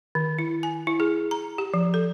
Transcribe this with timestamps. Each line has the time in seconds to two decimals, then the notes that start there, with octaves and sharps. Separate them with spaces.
0.15 D#3
0.39 E4
0.63 G#5
0.87 E4
1.00 G#4
1.31 A#5
1.58 G4
1.74 F3
1.94 A4